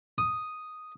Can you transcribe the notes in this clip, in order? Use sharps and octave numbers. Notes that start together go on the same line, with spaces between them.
D#6